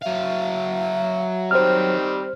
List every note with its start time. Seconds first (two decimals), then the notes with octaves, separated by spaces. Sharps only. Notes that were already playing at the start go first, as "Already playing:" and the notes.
0.02 F#3 E5 F5
1.51 D#3 G3 C4 C5 F6